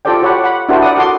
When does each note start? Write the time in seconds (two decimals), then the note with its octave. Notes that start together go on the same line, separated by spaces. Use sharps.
0.05 F4 G4 A4 C5 D5 G5
0.22 F#4 G4 C#5 D5 F#5 B5
0.44 F#5 B5
0.69 D4 E4 F#4 G4 A#4 C5
0.82 D5 F#5 D#6
0.97 F#4 A4 C6 D6